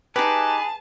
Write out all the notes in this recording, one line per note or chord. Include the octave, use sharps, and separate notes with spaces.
D#4 G4 G#4 B4 A5